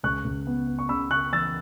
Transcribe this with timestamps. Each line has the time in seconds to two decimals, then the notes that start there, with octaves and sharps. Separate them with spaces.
0.04 C#2 C#6 F#6
0.24 C#2
0.47 B3
0.68 B3
0.79 C#6
0.89 C#3 B5 E6
1.10 C#3 C#6 F#6
1.33 E3 E6 A6